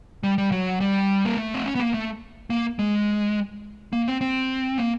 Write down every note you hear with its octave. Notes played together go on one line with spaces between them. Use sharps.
G3
G3
F#3
G3
A#3
A3
C4
C#4
B3
A#3
A3
A#3
G#3
A#3
C4
C4
A#3